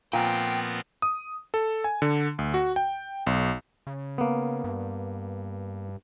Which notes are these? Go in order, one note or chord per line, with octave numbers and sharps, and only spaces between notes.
A#2 F3 B3 C4 G5
D#6
A4
G#5
D3
D2
F#4
G5
B1
C#3
A#3 B3
G2